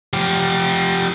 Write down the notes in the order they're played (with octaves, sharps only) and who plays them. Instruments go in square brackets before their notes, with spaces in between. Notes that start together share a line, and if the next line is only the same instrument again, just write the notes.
[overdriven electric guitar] F3 G4